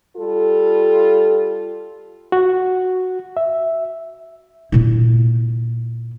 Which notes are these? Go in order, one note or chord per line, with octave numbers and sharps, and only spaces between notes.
G3 F4 A4
F#4
E5
A#2 E4